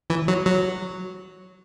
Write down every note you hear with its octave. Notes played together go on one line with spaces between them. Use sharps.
E3
F#3
F#3